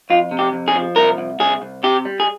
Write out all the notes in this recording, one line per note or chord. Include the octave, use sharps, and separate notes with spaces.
F2 F4
C3
G4
F2
G#4
F3
C2 A#4
C2
C2 G#4
C2
C3 G4
G3
G#4